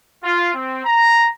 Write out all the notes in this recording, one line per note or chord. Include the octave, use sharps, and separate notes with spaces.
F4
C4
A#5